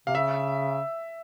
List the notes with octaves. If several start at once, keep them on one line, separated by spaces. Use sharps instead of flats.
C3 F5
C#3 E5